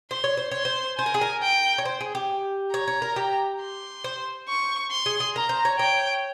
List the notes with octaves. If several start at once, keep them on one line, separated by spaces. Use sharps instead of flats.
C5 C6
C#5
C5
C#5 C6
C5
C5 G#5
A#4
G#4
A#4
G5
C#5
C5
G#4
G4
C#5 A#5
C#5
A#4
G4
C6
C5
C#6
C6
G#4
G#4
A#4 A#5
C5
C#5
C#5 G5